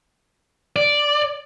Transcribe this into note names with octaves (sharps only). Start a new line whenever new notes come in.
D5